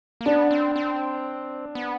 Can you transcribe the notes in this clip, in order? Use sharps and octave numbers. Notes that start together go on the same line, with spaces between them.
A#3
B3 D4
C4
C4
B3